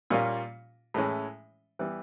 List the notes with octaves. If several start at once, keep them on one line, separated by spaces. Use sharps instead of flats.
A#2 G3 A#3 C#4 F4
A2 E3 G#3 C#4
E3 G3 B3